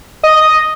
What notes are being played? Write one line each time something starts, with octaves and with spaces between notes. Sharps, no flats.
D#5